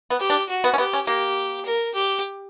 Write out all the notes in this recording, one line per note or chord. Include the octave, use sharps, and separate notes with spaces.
B3
G4
D4
F#4
B3
C#4
B3 G4
C#4
A#3 G4
A#4
G4